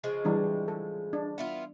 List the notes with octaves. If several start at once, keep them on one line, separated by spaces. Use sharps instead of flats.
C#3 F3 G#3
E3 G3 D4
A4
D4
B3 E4 F4